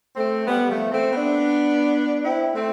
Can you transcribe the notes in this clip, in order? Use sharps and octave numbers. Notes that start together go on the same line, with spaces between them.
A3 C4
G3 B3
F3 A3
A3 C4
B3 D4
C4 E4
A3 C4